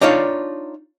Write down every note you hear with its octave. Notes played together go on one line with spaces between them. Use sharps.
D4 D#4 F4 C#5 D5 F5